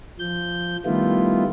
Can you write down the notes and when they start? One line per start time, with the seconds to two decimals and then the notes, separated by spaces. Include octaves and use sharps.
0.19 F3 G6
0.85 D#3 G3 A3 B3 E4 F4